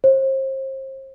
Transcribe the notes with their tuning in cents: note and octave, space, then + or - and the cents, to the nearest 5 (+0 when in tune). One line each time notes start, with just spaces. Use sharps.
C5 +35